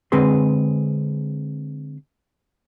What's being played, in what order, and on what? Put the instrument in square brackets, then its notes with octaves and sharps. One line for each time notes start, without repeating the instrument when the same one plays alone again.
[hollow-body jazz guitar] D3 G#3 C4 G#4 B4 C6